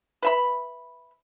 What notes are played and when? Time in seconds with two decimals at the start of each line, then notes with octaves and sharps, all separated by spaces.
0.23 B4 E5 B5